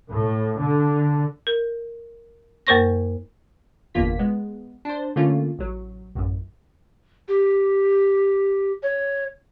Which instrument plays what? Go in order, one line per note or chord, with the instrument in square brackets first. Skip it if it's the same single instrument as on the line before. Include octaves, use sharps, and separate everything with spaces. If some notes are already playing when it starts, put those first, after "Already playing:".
[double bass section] A2
D3
[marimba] A#4
F#2 A#3 A#4 C5 C#6 A#6
[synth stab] G1 E2 B2 A#3 F4 B6
G#3 B3
D4 C5
D3 A3 A#3 C#4 F4
A1 F#3
A1 F#2
[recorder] G4
C#5